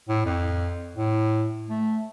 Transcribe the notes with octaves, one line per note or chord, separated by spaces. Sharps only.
A2
F2
A2
A3